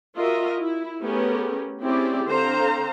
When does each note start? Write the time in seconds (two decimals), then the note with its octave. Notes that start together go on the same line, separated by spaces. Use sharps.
0.16 F4 F#4 A#4 D#5 E5
0.60 E4
1.01 A3 B3 C#4 G4 G#4 A#4
1.82 C4 C#4 E4 G4 G#4 D5
2.29 D3 C4 C5 F5 A#5